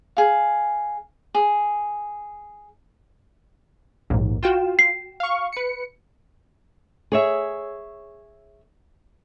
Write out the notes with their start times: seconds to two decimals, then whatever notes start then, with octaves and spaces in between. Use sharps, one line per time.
0.17 G#4 F5
1.34 G#4
4.10 A#1 D#2 G#2
4.43 F4 F#4 G5 E7
4.79 C7
5.20 F5 C#6
5.53 B4 C#7
7.12 G#4 C#5 E5